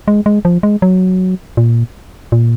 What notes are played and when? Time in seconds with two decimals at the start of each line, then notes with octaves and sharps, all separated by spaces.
0.08 G#3
0.26 G#3
0.45 F3
0.63 G#3
0.82 F#3
1.57 A#2
2.32 A#2